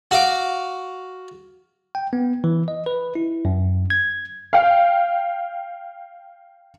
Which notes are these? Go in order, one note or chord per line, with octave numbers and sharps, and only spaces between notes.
F#4 F5 D6
G5
B3
E3
D#5
B4
E4
F#2
G#6
F5 G5